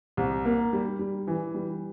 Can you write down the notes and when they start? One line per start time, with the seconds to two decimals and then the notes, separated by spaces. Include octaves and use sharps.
0.17 C2
0.45 A#3
0.73 G3
0.99 G3
1.27 E3
1.54 G3